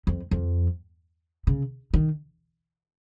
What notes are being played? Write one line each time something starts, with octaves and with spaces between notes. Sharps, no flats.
F2
F2
C#3
D#3